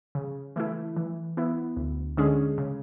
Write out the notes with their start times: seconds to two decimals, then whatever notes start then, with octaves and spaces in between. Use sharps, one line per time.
0.15 C#3
0.56 E3 A3 E4
0.97 E3
1.37 B3 E4
1.77 D2
2.17 D3 G#3 C#4 G#4
2.58 C#3